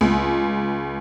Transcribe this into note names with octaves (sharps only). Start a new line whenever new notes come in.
C#2